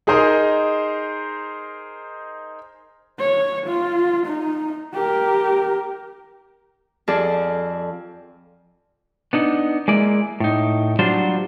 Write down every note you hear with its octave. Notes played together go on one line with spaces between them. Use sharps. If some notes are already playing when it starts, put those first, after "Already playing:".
D#4 G#4 A#4 C5 D#5
C#5
F4
D#4
G4 A#4
F2 G#4 A4 D5
B3 D4 D#4
G#3 A#3 E4 D5
A2 D#4
F#3 G3 D4 F4 C5